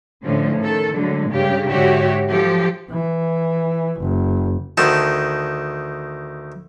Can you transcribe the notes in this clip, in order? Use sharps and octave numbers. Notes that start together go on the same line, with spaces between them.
A2 D3 F3 C#4
D#3 A4
D3 F#3 G#3 A3
G2 C#3 G4
G#2 D3 F#4 G4 C#5 E5
F3 F#3 G4 A4
E3
F#1
D2 D#3 A5